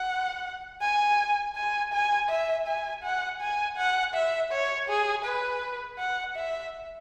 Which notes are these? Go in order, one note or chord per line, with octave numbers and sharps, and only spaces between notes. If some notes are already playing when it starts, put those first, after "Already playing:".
Already playing: F#5
G#5
G#5
G#5
E5
G#5
F#5
G#5
F#5
E5
C#5
G#4
B4
F#5
E5